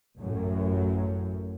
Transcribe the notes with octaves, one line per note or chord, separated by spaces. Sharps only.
A1 F#2 A2 F#3